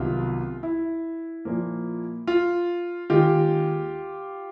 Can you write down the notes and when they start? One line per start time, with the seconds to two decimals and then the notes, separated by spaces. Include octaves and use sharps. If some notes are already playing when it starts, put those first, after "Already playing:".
Already playing: C2 C3 D#3 F#3 B3 F4
0.63 E4
1.45 A#2 F3 A#3
2.27 F4
3.10 D#2 D#3 G#3 F4 G4